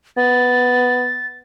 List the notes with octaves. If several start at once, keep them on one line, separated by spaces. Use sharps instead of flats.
B3 A6